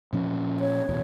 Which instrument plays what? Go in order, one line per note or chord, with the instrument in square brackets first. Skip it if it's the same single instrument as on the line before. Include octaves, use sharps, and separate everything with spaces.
[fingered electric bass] A#2 F3 C#4
[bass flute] C#5
[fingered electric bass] D1 E2 B2